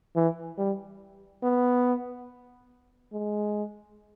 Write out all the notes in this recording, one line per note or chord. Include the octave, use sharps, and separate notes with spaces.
E3
G3
B3
G#3